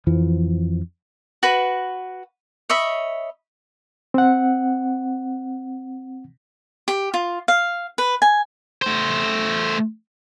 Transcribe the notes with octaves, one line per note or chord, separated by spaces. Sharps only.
F2 E3 F3
F#4 B4
C#5 D#5 E5 B5
C4 F#5
G4
F4
F5
B4
G#5
A3 C5